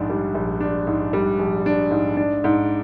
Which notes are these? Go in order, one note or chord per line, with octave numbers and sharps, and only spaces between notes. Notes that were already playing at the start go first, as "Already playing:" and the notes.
Already playing: A#1 G#2 D4
G3
A#1
D4
G#2
G3
A#1
D4
G#2
D4
G#2